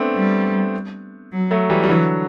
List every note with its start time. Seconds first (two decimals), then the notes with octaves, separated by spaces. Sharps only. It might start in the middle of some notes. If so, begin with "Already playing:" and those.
Already playing: A3 B3 C4 D4
0.16 G3
1.32 F#3
1.51 F#3 A3
1.70 E3 G3
1.84 G3
1.89 D3 E3 F#3